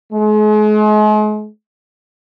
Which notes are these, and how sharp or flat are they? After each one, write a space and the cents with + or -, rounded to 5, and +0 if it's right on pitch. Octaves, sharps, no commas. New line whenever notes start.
G#3 +40